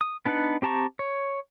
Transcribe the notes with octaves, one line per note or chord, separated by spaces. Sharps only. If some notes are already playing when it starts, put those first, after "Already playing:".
D#6
B3 D4 D#4 B4 F#5
C4 G4 A5 A#5 C#6
C#5